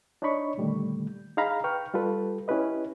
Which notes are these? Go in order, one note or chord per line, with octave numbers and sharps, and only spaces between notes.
D4 D#4 C#5 D#5 B5 C#6
A#2 D3 D#3 G3 A3
D#4 G#4 F5 A#5 B5
B4 G5 C#6 F6
G3 F4 G4 A4 B4
C#4 E4 G4 B4 D#5